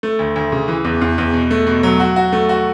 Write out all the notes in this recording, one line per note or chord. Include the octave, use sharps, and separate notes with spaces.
A3
D2
D2
C#3
E3
E2
E2
E2
B2
A3
B2
F#3
F#4
F#4
A3
F#4